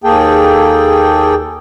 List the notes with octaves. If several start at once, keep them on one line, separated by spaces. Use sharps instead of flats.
D#2 A#3 G#4 A4 G5